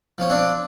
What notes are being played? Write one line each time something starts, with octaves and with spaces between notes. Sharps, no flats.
F3 C#4
C4 D4